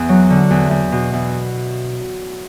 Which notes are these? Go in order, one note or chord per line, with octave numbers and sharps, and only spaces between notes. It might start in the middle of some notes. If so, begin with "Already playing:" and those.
Already playing: E2 B3
F#3
D3
E2
E2
B2
E2